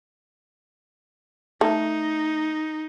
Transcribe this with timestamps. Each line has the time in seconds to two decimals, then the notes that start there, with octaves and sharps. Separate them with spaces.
1.61 A3 D#4